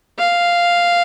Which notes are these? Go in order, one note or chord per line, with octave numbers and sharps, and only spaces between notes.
F5